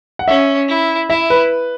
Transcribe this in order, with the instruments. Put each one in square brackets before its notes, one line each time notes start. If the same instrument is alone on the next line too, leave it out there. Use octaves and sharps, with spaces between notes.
[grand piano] F#5
[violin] C#4 [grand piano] E5
[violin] E4
[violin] E4 [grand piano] E5
[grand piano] B4